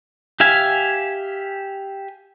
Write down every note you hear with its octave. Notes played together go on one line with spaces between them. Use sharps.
G4 E5 F5 G#5